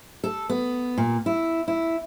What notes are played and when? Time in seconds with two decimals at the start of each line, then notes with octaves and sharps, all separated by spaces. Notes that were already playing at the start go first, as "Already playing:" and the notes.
0.24 A4
0.49 B3
0.98 A#2
1.26 E4
1.68 E4